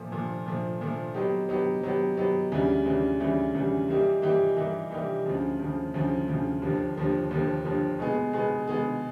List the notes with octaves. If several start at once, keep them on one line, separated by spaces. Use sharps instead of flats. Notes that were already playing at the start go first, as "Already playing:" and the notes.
Already playing: A#2 F3 A3
A#2 F3 A3
A#2 F3 A3
A#2 F3 A3
F#3 B3 D#4 G4
F#3 B3 D#4 G4
F#3 B3 D#4 G4
F#3 B3 D#4 G4
D2 C#3 E3 G3
D2 C#3 E3 G3
D2 C#3 E3 G3
D2 C#3 E3 G3
E3 G3 A#3 D#4 G4
E3 G3 A#3 D#4 G4
E3 G3 A#3 D#4 G4
E3 G3 A#3 D#4 G4
D2 C#3 F3
D2 C#3 F3
D2 C#3 F3
D2 C#3 F3
D#2 D3 F3 A#3
D#2 D3 F3 A#3
D#2 D3 F3 A#3
D#2 D3 F3 A#3
B2 G#3 B3 D#4 G#4
B2 G#3 B3 D#4 G#4
B2 G#3 B3 D#4 G#4